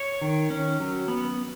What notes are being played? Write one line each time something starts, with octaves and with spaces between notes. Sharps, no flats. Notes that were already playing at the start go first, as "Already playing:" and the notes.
Already playing: C#5
D#3
C#4
F#3
B3